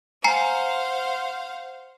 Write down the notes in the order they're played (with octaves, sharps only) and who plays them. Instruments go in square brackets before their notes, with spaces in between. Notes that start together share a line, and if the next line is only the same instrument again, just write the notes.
[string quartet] C5 F5 F#5 [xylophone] G#5 A#5 C7